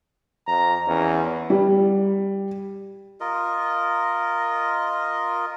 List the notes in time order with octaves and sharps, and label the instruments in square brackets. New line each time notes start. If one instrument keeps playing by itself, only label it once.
[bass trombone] F2 [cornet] A#5
[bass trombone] E2 [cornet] C#4
[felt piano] G3
[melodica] F4 A#4 D#5